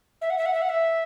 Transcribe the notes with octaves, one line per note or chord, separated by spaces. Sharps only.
E5
F#5
E5
F#5
E5
F#5
E5